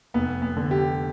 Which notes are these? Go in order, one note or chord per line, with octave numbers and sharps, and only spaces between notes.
F1 B3
B3
D3
G4